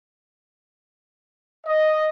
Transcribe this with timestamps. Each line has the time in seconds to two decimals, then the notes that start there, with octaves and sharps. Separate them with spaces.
1.67 D#5